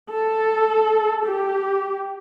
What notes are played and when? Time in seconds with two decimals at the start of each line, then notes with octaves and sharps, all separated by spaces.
0.11 A4
1.26 G4